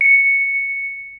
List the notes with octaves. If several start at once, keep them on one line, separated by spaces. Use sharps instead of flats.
C#7